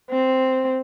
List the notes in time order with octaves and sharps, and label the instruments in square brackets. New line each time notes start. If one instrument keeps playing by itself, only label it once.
[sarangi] C4